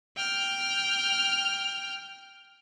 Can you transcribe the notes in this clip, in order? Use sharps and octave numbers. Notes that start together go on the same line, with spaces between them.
G5 F6